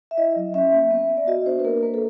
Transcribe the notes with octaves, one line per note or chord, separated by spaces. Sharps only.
E5
E4 D#5
F#3
C#4 E5
A#3
B3
B3
D5
F#4 D#5
D4 C5
B4
A#3 A#4
A#3 B4
A4